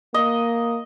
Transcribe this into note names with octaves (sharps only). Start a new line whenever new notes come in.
A#3 D#5